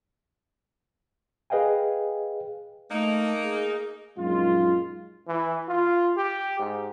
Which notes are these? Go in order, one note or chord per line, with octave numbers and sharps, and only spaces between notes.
G#4 B4 D#5 F5 G5 G#5
A3 A#3 D#4
G#4
A#1 F#2 G#3 D#4 F4
E3
F4
G4
G#2